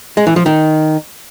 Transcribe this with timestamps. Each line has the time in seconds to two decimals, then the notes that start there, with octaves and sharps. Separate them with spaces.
0.17 G#3
0.27 E3
0.36 F3
0.46 D#3